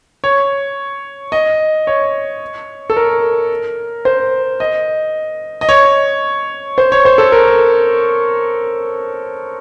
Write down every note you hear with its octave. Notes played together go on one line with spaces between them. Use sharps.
C#5
D#5
C#5
A4
A#4
C5
D#5
D#5
C#5
C5
C#5
C5
A4
A#4